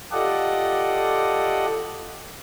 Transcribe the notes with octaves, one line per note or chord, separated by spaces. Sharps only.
F4 G4 A4 D5 D#5 F#5